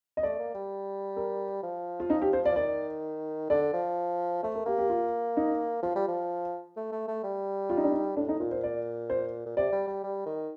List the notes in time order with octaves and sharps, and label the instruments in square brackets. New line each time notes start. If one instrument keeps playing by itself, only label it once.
[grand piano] D#5
[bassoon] A3 [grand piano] D5
[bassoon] A#3
G3
[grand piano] A#4
[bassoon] F3
[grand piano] F4
D#4
G4
C5
D5
[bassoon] F3
[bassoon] D#3 [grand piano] D5
[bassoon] D3 [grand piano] D5
[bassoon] F3
[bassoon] A3 [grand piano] C5
[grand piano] A#4
[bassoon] A#3 [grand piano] G4
[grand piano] G4
F4
D#4
[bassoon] F3 [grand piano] F4
[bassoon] G3
F3
A3
A3
A3
G3
[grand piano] F4
D#4
D4
D#4
[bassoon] A2 [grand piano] D4
[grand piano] D#4
[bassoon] A#2 [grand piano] F4
[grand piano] C5
D5
C5
[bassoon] A#2
[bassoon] C3 [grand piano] D5
[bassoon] G3
G3
G3
D#3